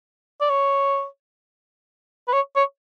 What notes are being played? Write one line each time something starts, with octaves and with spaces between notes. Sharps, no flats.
D5
C#5
B4
C#5
C#5